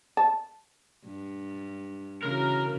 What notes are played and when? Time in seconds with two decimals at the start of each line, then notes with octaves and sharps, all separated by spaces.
0.17 A5
1.05 G2
2.23 C#3 E3 F#4 A#4